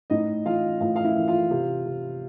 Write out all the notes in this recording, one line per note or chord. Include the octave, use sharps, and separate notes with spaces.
A2 D#4 D#5
E3 F4 F5
A2 F4 F5
F5
E4 E5
E3
F4 F5
C3
C3